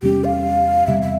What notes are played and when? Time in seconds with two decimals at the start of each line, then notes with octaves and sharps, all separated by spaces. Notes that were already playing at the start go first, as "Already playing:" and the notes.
0.02 E2 C3 G3 C#4 G4
0.24 F5
0.87 E2 C3 G3 E5
1.02 E5